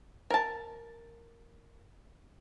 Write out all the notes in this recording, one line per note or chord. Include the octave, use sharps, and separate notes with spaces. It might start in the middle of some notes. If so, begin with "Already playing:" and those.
A#4 A5